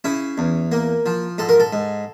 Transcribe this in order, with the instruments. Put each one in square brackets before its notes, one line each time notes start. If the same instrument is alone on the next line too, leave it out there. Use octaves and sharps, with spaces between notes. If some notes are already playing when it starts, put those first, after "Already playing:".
[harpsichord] C#3 E4
E2
A#3
F3
G#2 A4
A#4
A4
G#2